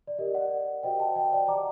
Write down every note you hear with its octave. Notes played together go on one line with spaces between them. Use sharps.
D5
G4 A#4 D5 D#5
D5 F#5
F#4 C5 D#5 G5
F#5 A5
D#5 G5
D5 F#5
G4 D5 A#5 D6